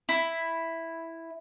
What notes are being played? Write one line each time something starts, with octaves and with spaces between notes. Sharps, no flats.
E4